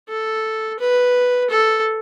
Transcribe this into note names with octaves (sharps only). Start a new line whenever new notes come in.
A4
B4
A4